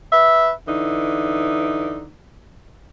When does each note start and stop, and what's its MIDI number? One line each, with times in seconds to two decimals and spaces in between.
0.12 0.51 71
0.12 0.51 76
0.67 2.08 50
0.67 2.08 52
0.67 2.08 63